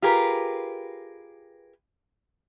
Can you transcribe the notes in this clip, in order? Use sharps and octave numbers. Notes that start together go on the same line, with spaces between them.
F4 G4 G#4 A#4 B4